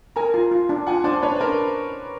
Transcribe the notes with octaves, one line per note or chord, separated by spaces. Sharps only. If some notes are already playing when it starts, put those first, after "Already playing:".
A#4 G#5 A#5
F4
F4
D4
F4 F#5 G#5
D4 C5 D5
D4 B4 C#5
D4 A#4 C5